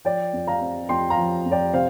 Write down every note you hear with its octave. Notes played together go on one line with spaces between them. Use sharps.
F3 D5 G5
F2
F5 A#5
C4
F2 G5 C6
F5 A#5
F3
F2
D5 G5
C3 C5 F5